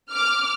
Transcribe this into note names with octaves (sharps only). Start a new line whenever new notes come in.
D6 F6